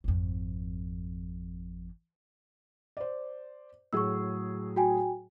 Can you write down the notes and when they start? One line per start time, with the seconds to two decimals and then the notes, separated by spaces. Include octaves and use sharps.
0.04 G#1 F2
2.97 C5 D5
3.93 A2 F#3 G#4 C#6 E6
4.76 F#4 G5 G#5